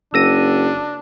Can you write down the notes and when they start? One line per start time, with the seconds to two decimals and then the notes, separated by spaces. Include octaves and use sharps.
0.14 F#1 D4 E6 A#6 D#7